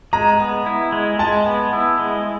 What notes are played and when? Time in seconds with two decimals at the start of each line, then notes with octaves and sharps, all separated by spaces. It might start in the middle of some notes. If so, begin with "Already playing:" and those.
0.13 G#3 A#5
0.40 B3
0.66 E4
0.92 G#3
1.19 G#3 A5
1.46 B3
1.73 E4
1.99 G#3